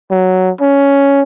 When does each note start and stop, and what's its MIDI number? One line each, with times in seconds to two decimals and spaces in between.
0.11 0.51 54
0.61 1.23 61